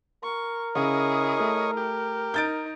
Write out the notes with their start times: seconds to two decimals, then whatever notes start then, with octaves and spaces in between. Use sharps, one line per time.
0.24 A#4 C#6
0.75 C#3 E4 G#4 C#5 D#5
1.40 A3
1.77 G4
2.34 D#4 G6 A6 D7